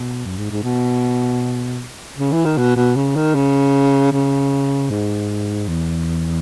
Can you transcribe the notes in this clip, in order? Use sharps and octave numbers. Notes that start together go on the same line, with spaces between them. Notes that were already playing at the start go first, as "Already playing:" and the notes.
Already playing: B2
F#2
G#2
G#2
B2
C#3
E3
D#3
B2
B2
C#3
D#3
C#3
C#3
G#2
E2